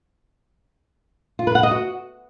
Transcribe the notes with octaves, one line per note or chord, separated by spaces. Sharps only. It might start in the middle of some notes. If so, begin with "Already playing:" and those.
F4
B4
F#5
D#5
F#4